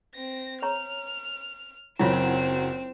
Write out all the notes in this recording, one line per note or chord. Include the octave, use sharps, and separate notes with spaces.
C4 A#6
C#5 A#5 F6
F#1 F#3 C4 E4 F4 C#5 E7